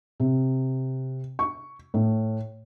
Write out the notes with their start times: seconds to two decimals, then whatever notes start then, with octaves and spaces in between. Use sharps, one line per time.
0.20 C3
1.39 C#6
1.94 A2